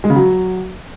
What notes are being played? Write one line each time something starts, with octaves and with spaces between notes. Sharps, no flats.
G#3
C#3
F#3